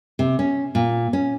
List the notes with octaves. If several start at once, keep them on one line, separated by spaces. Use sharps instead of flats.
C3
C#4
A#2
C#4